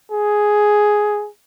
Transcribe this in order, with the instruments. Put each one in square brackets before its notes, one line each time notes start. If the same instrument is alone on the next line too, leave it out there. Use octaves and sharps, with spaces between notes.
[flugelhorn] G#4